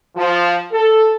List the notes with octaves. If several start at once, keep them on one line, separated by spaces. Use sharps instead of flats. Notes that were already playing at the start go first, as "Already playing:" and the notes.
F3
A4